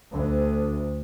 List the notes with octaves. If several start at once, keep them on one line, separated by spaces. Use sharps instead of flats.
D2